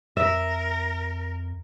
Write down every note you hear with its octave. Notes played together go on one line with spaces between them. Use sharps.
F2 A#4 E5